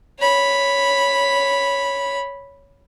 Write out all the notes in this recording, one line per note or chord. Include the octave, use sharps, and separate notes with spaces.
C#5 B5